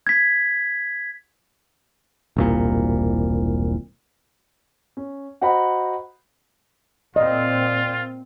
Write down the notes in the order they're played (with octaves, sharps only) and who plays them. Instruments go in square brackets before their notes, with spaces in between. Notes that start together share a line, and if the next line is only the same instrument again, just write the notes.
[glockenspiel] G#6 B6
[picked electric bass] E1 C2 A#2
[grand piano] C#4
F#4 C5 D#5 F#5 A#5 B5
[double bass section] A#2 C4 [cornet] F4 [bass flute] D5 [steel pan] D#5